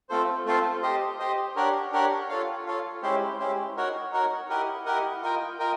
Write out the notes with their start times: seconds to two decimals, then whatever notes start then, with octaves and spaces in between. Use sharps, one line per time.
0.09 A3 C4 F4 A4 C5
0.46 A3 C4 F4 A4 C5
0.83 G4 C5 D#5
1.19 G4 C5 D#5
1.56 D4 G4 A#4 C#5 F#5
1.92 D4 G4 A#4 C#5 F#5
2.29 F4 A4 C#5 F5
2.66 F4 A4 C#5 F5
3.03 G#3 C#4 E4 G4 C5
3.39 G#3 C#4 E4 G4 C5
3.76 D#4 F#4 A#4 C#5 F#5
4.12 D#4 F#4 A#4 C#5 F#5
4.49 E4 G4 A#4 D#5 F#5
4.86 E4 G4 A#4 D#5 F#5
5.22 F4 A#4 D#5 G5
5.59 F4 A#4 D#5 G5